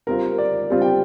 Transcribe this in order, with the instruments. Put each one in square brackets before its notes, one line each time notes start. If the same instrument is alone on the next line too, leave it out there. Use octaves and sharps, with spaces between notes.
[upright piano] G3 C4 F4 [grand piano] A#4
[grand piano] D5
[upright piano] G3 C4 F4
[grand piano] G5